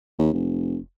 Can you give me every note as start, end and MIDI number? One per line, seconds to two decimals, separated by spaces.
0.19 0.31 39
0.33 0.77 29